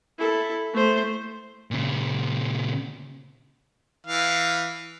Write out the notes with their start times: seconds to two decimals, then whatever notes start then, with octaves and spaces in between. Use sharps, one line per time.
0.19 E4 A4
0.74 A3 C5
1.71 A#2 C#3
4.07 E3 F5